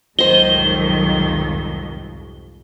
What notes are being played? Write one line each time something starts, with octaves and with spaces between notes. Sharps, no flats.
C2 F2 G#2 D#3 F#3 C5 D#5 G7